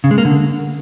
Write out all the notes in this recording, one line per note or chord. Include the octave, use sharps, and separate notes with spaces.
C#3
G#3
A#3
D3